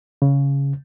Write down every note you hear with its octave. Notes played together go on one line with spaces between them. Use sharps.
C#3